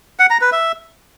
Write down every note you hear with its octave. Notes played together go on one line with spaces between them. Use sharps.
F#5
A#5
B4
E5